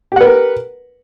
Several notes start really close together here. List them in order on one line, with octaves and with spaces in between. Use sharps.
G4 F#5 B4 A#4